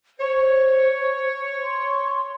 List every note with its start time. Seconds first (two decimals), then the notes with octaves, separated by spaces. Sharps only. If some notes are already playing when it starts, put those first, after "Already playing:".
0.19 C5 C#5
1.62 C6